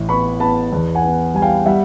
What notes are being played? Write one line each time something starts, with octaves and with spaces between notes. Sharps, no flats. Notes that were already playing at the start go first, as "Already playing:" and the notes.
Already playing: A1 E4
B3 B5 C#6
B3 A5 B5
E2
F#5 G#5
B3
G3 G#5
F5 G5
G3 E5 F#5